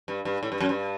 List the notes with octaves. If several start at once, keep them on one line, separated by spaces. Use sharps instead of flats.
G2
G2
A2
G2
F#2
G2